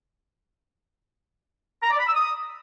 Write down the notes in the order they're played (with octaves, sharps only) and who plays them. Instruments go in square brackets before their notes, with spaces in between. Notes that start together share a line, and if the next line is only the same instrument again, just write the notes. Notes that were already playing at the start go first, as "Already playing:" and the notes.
[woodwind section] A#5
D5
B5
E6
D#6